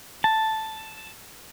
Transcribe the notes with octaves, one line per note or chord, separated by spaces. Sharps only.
A5